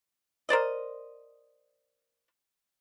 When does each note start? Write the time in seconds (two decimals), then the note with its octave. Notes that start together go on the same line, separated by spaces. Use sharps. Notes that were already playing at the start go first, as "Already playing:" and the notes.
0.49 A#4 C5 D5 D#5